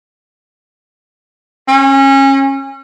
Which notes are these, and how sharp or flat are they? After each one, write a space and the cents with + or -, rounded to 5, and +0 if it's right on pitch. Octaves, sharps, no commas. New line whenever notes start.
C#4 -25